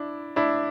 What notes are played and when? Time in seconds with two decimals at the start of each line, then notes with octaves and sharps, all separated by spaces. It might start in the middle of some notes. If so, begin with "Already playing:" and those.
Already playing: D4 E4
0.36 D4 E4